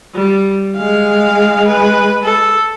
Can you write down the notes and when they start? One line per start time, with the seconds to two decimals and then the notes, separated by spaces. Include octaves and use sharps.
0.14 G3
0.77 G#3 F5
1.66 B4
2.23 A4